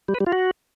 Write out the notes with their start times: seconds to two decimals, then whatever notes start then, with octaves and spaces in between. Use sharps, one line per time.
0.08 G3
0.14 B4
0.20 G3
0.26 F4
0.32 F#4